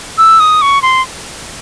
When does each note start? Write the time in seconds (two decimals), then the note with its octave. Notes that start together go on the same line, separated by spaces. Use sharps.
0.18 E6
0.40 D#6
0.62 C#6
0.82 C6